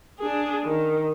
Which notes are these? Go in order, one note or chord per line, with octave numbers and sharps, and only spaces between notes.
D4 G#4
D#3